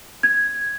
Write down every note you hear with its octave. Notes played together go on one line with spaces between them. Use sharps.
G#6